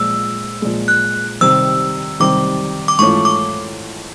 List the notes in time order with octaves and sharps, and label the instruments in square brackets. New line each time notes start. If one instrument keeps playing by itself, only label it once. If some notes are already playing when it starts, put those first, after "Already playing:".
Already playing: [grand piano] A#2 F3 G#3 [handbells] E6
[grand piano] A#2 F3 G#3
[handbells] F#6
[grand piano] C3 D#3 G3 C4 [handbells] E6
[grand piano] C3 D#3 G3 C4 [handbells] D6
[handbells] D6
[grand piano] G#2 E3 A3 C#4 F4 [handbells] C#6
[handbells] D6